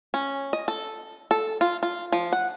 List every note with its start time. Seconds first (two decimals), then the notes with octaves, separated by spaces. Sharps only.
0.14 C#4
0.53 D#5
0.68 A4
1.31 A4
1.61 F4
1.83 F4
2.12 F3
2.33 F#5